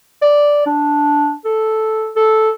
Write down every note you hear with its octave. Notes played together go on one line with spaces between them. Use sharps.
D5
D4
A4
A4